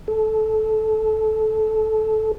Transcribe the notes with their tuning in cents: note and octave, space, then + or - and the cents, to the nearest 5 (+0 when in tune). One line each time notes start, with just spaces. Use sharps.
A4 -15